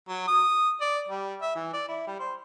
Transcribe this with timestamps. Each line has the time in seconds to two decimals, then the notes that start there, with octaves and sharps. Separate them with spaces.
0.08 F#3
0.28 D#6
0.81 D5
1.09 G3
1.42 E5
1.55 E3
1.73 D5
1.88 E4
2.07 G3
2.19 C5